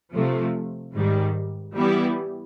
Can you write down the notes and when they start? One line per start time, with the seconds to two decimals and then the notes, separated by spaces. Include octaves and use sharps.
0.13 C3 F3 A3
0.94 G#2 D#3 G3
1.75 E3 G3 B3 E4